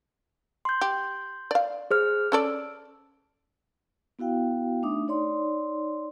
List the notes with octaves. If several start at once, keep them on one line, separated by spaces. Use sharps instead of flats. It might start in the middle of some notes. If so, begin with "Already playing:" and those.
C6 G6
G4
D5 F5
G#4 C5 F6
C#4 A4 D5 E6 D7
B3 E4 F#4 F5 G5
A3 D4 D#4 E5 D6 D#6
D#4 C#5 D5 C6